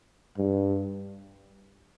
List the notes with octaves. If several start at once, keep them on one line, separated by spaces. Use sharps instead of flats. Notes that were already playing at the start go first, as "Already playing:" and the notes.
G2